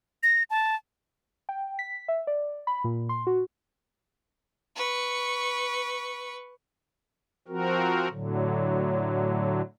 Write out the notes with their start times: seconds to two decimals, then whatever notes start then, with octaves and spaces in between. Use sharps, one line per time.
0.23 A#6
0.50 A5
1.49 G5
1.79 B6
2.08 E5
2.27 D5
2.67 B5
2.84 A#2
3.09 C6
3.27 F#4
4.76 B4 C#6
7.48 F3 C4 F#4 A#4
8.10 A2 D3 F#3